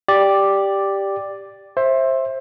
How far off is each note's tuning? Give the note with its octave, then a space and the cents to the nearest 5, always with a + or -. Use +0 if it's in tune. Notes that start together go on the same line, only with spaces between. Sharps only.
G4 +0 D5 +0
C5 +20 E5 +0